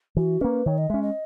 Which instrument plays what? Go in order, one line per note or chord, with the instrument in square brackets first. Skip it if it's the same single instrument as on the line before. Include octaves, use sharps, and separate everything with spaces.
[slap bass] E3 [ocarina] F#4
[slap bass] A#3 C#4 [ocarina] B4
[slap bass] D#3 [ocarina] C#5
[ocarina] D#5
[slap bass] G#3 C#4 [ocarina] E5
[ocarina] D#5